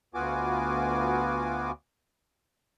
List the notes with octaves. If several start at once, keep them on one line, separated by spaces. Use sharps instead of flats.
D2 B3 F4 F#4 G#5 D6